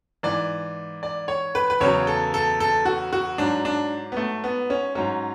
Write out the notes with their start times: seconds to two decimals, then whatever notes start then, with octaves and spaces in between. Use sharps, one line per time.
0.23 G#2 E3 D5
1.03 D5
1.28 C#5
1.55 B4
1.70 B4
1.80 E2 C#3 F#3 C#5
2.07 A4
2.34 A4
2.60 A4
2.85 F#4
3.13 F#4
3.38 G#2 F#3 D4
3.65 D4
4.12 B3
4.17 A3
4.44 B3
4.70 C#4
4.95 G#2 F#3 C#4